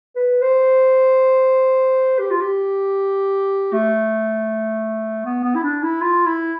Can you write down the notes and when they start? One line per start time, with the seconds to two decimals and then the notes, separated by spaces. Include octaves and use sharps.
0.16 B4
0.42 C5
2.19 G4
2.31 F4
2.41 G4
3.73 A3
5.25 B3
5.44 B3
5.55 E4
5.63 D4
5.83 E4
6.02 F4
6.26 E4